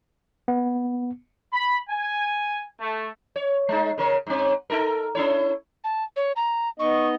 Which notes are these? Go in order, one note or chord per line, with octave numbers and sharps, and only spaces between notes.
B3
B5
G#5
A3
C#5
G#3 D#4
C#3 A#4 C#5
G#2 C4
D#4 A4 A#4
C#4 E4 C#5
A5
C#5
A#5
B3 D#4 D#5 C#6